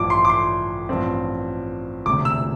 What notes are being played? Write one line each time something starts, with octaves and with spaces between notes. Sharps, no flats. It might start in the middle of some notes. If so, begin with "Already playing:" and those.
Already playing: A1 G2 F3 D6
C6
D6
C6
A1 G2 F3 C4
E1 D2 C3 D6
E6